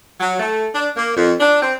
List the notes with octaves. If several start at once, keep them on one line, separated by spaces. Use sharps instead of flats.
F#3
A3
D4
A#3
F2
D4
C4